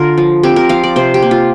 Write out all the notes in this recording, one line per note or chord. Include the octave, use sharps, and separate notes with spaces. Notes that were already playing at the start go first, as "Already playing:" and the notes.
Already playing: D3 F4 A#4
F3
C4 G4
A#4
F3 F5
D5
C3 C5
G4
A#3
F4